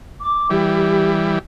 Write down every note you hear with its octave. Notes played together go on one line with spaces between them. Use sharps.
D6
E3 G3 G4